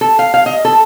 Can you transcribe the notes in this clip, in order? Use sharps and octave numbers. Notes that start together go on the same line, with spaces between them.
A4
F5
F5
D#5
A4